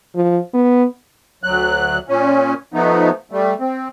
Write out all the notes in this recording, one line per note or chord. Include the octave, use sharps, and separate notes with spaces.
F3
B3
D2 F#3 F#6
A#2 C#4
F3 A3 B3 D#4
G3 A3
C4